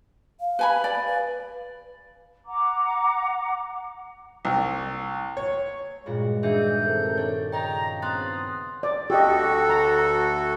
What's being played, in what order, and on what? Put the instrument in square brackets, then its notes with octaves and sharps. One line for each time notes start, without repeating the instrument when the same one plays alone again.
[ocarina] F5
[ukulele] B4 G#5 B5
D5
[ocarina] B4
[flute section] F#5 A#5 D6
[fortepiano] C2
C#5
[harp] G2 A#2 F#4 [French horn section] G#3
[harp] D#3 D#4 [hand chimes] D4 G#4 E5 [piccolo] G6
[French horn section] C3 A4 A#4
[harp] D4 [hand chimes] C#5
[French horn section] C#3 [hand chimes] C#5 D#5 G5 [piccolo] A#5
[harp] B3 C4 [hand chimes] C6 F#6 A6 [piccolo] D#6
[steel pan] D5
[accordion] D2 F#4 A4 [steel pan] G4 D#5
[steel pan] A#5